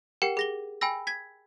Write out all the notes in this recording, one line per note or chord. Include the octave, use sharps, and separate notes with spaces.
G4 A#4 F#5 G5 C#7
G#4 A#6 G7
G5 G#5 B5 E6 A#6
G#6 B6